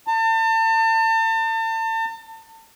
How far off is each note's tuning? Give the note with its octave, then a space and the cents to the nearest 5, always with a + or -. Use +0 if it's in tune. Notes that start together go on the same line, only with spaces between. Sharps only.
A5 +35